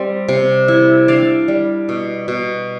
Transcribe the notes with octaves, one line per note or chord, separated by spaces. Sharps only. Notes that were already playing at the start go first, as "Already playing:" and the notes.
Already playing: G3 C4 C5
C3
E4
D4 D5 F5
G3
B2
B2